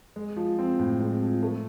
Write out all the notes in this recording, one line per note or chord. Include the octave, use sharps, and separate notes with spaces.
G#3
F3
C4
A2
G#3
F3
A3